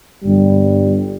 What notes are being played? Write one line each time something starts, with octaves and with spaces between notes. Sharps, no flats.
G1 G2 G3